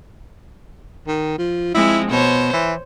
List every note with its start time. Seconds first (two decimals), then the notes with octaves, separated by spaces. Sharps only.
1.07 D#3
1.38 F3
1.74 F3 G#3 C4 E4
2.11 B2 C5 C#5
2.53 E3